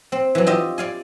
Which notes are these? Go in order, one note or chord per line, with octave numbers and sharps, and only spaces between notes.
C4
E3 F#3
F4 G4 D#5 E5
D5 F5 G#5